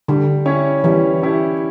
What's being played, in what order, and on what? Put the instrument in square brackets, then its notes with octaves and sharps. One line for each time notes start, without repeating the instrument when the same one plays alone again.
[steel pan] D3 [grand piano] G3
[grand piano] C#4 E4 G4 C#5
[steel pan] E3 [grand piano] G3
[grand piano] C#4 E4 G4 C#5